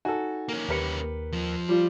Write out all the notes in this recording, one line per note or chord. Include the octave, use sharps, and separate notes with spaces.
D#4 F#4 A4 G#5
A#3 C#4
D#2 G4 A#4 B4 C#7
F2 F3
G3 F4